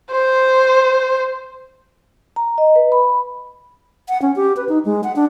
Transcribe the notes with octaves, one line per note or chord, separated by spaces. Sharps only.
C5
A#5
D#5
B4
B5
F#5
C#4
G4
B4
D#4
G#3
F#5
D4